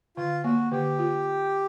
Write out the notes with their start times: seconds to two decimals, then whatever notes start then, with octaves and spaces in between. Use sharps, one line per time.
0.17 D3 F4
0.44 A#3 F#4
0.71 D3 G4
0.99 F4